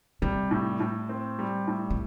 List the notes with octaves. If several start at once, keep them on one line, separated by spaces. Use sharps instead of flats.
C3 G3
A2
A2
C4
G3
A2
C3